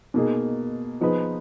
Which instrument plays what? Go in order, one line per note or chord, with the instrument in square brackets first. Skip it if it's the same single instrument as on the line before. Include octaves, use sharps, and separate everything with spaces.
[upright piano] B2 A#3 D#4 G#4
F3 B3 D#4 G#4 B4